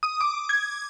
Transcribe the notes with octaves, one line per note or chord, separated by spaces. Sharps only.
D#6
D6
G#6